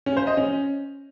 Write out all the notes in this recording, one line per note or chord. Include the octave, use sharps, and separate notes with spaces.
C#4
C5
D#5
C#4